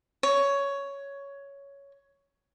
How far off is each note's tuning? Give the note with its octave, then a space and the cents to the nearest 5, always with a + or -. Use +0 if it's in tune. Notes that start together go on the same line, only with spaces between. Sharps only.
C#5 +10